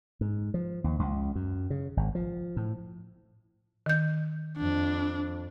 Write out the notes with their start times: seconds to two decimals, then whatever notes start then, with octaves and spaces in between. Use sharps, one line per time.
0.21 G#2
0.54 F3
0.84 D#2
0.99 C#2
1.35 F#2
1.70 C#3
1.97 G#1
2.15 F3
2.57 A2
3.86 D#3 G6
4.57 F2 D4